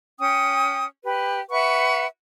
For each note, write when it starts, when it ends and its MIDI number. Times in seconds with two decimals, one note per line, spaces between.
0.19 0.85 61
0.19 0.85 79
0.19 0.85 87
1.04 1.40 67
1.04 1.40 71
1.51 2.06 71
1.51 2.06 76
1.51 2.06 78
1.51 2.06 85